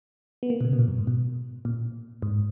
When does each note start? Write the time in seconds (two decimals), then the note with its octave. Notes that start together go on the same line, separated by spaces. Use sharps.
0.43 B3
0.50 A#3
0.61 B2
0.65 C#3
0.73 B2
0.79 A#2
0.88 F#2
0.98 G#2
1.07 B2
1.65 A#2
2.22 G#2